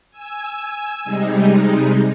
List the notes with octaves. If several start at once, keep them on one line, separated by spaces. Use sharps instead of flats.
G#5 E6
C3 G3 G#3 D#4